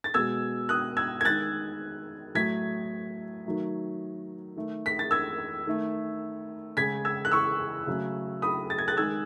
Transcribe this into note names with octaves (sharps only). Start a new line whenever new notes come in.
A6
B2 G#3 E6 G#6
D#6 F#6
E6 G#6
G#6
D#3 G#3 F#6 A6
A2 F#3 A3 G#6 B6
D#3 F#3 A3
D#3 A3
B6
A6
E6 G#6
D#3 A3
C#3 G#3 G#6 B6
E6 G#6
F#6
C#6 E6
C#3 F#3 A3
B5 D#6
A6
G#6
F#6 A6
D#3 G#3 E6 G#6